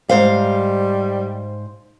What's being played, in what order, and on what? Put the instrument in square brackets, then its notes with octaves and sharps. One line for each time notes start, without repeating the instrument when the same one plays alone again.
[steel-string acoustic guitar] G#2 C5 F5 [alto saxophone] G3